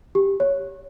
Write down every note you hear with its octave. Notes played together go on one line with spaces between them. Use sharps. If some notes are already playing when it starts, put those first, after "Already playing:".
G4
C#5